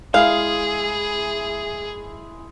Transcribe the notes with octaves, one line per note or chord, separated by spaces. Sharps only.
G#3 E4 G#4 F5